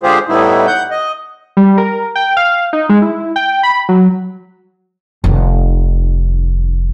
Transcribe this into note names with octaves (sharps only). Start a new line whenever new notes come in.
D3 G#3 F4 G4 G#4 C5
A2 G3 A3 B3 D#4 E4
F#5 G6
D#5
G3
A#4
G5
F5
D#4
G#3
E4
G5
B5
F#3
F1 D#3